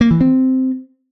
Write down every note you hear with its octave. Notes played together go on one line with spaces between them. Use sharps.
A#3
E3
C4